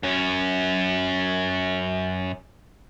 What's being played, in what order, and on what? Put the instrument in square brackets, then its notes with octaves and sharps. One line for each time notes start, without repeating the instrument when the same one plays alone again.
[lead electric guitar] F#2 C#4